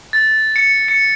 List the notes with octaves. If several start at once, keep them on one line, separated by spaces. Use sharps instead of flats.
A6
C#7
C#7